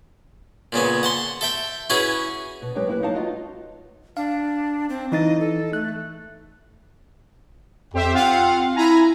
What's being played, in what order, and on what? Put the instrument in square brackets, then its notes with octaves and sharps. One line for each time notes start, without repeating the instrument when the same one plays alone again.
[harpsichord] A#2 C#3 B3 C#4
F#5 A5 C6
A4 E5 G5
C#4 E4 F#4 G#4 B4
[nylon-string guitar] B2
F#3 G#3 D#4 G4 B4 C#5
A#3 E4 B4
F#3 D#4 A4 F5 A5
F4 F#4 B4 D#5
[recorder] D4 [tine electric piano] F5
[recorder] C4
[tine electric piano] E3 D#4 A6 [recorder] D#5
[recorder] A4
[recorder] A3 [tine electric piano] F#6
[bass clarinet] F2 [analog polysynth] G4 C5 E5
[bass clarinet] C4 [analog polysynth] F4 F5 F#5
[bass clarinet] E4 [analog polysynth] G#5 A#5 B5